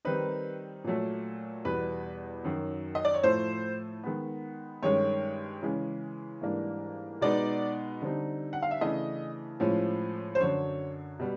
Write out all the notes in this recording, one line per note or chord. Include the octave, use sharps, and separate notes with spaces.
D#3 G3 C4 D#4 B4
A#2 F#3 A3
E2 B2 G3 B3 B4
F#2 D#3 F#3
D#5
D5
C#5
A2 F3 A3 C5
D#3 G#3 B3
G2 D#3 G#3 C#4 C#5
C#3 E3 G#3 C#4
G#2 E3 G3 A#3 D4
B2 G#3 B3 D#4 D5
D3 G3 C4 D#4
F#5
F5
E5
C#3 E3 A3 D4 D#5
A2 F3 G#3 C#4
C5
F#2 D3 F#3 C#5
B2 G3